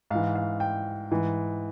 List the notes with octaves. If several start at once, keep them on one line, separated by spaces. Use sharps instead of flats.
G#2 E3 F5
F5
G5
G#2 E3